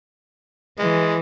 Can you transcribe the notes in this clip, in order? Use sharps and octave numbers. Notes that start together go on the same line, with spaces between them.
E3 G#3